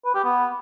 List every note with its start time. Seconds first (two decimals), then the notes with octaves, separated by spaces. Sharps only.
0.05 B4
0.14 G4
0.24 B3